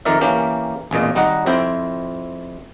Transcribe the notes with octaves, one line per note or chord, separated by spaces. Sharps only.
F2 D#3 A#4 D5 E5
E3 A#3 C#4 G4
A1 E2 A#2 D#5
G#1 G3 D#4 D#5 F#5
F2 C4 E4 G5